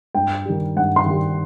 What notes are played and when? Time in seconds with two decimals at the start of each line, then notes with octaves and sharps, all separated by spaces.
0.15 G2 G5
0.45 D#3 G3
0.76 G2 F#5
0.96 C6
1.06 D#3 G3